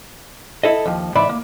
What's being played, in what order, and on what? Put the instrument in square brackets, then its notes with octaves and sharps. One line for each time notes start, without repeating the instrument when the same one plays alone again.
[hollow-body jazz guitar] E4 A4 D#5
D#2 F3
G#2 E3 D5 E5 B5
A#3